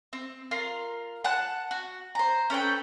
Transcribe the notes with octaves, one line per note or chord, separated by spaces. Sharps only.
C4
F4 A#4 C6
F#5 A5 F#6
F#4
C5 A#5
C#4 A4 B4 G5